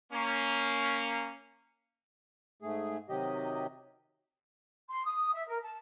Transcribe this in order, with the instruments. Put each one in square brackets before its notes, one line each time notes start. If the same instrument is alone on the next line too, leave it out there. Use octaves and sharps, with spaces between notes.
[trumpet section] A#3 C#4
[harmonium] G#2 A3 G#4
C3 D#3 F#3 G4 D#5
[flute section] C6
D#6
E5
A#4
A5